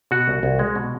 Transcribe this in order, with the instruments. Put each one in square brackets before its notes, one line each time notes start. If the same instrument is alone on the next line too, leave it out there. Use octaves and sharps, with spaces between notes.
[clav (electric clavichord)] B2 F#4
C2
C2
G#3
B2